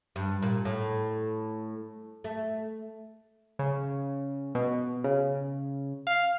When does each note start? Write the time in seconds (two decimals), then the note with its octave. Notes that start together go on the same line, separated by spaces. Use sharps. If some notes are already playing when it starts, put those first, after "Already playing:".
0.16 G2
0.42 A#2
0.65 A2
2.24 A3
3.59 C#3
4.55 B2
5.04 C#3
6.07 F5